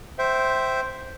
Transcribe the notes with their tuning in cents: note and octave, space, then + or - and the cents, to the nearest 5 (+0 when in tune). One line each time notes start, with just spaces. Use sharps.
C5 +0 E5 +0 G5 -20